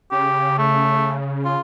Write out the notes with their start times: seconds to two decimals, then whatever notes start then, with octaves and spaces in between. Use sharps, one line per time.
0.12 C#3 G4
0.58 A3
1.45 F4